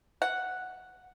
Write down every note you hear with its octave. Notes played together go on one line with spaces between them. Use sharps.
F#5